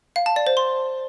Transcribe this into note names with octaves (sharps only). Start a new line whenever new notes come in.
F5
A5
D5
C5
C6